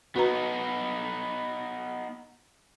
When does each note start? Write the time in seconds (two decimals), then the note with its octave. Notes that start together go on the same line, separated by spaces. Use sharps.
0.16 B3 D#4 F#4 B4 A#5